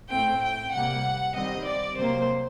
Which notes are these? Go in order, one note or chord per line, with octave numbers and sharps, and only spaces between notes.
A2 A3 C4 G5
G5
C3 G3 A#3 F#5
D#3 G3 C4 D#5
D5
C3 F#3 A#3 C5